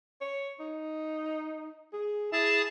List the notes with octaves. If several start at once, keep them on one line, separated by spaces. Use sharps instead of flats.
C#5
D#4
G#4
E4 G#4 A5 A6